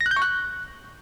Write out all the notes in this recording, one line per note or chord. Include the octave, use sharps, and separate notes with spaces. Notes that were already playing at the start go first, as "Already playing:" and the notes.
A#6
F#6
G6
C#6
F#6